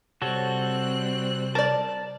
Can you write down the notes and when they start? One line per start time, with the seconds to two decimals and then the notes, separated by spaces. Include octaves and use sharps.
0.22 C3 G3 C4 F#4 A4 C#5 F#6
1.55 A#4 D5 A5